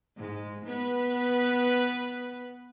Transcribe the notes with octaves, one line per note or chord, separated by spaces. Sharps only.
G#2 G#3
B3 B4